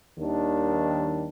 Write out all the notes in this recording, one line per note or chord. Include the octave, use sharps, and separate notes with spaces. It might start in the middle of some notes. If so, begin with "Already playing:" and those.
D#2 D#3 G3 D4